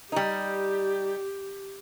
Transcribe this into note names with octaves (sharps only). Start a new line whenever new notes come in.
G3 D#4 G4